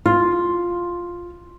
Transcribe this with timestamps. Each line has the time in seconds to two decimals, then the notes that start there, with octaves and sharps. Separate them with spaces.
0.06 F4